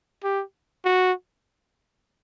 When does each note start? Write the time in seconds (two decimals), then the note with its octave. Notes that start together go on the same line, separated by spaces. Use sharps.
0.24 G4
0.85 F#4